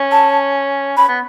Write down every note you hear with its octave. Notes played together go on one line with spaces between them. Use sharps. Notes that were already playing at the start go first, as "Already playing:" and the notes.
Already playing: C#4
A5
C#4 B5
B3